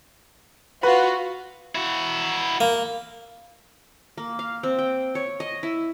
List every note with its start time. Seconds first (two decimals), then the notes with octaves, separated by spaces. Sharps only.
0.83 F4 F#4 B4
1.75 E4 F#4
2.61 A#3
4.17 A#3
4.39 F5
4.63 C4
4.79 G5
5.15 C#5
5.40 D#5
5.63 E4